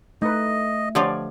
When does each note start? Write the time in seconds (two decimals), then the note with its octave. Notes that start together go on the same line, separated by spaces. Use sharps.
0.22 A3 D#4 B4 D#5
0.95 D3 F3 F4 G4 C#5 D5